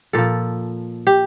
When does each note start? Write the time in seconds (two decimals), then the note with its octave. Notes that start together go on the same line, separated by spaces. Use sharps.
0.13 A#2 F3 A4
1.07 G4